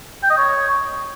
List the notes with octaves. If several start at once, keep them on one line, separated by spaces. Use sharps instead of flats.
G5
D#5
C#5